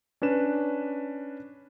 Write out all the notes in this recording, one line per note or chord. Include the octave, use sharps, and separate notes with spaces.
C#4 D4 B4 E7